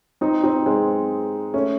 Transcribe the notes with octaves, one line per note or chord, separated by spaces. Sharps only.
C4 D#4
C4 D#4
G#3 C4
A3 C#4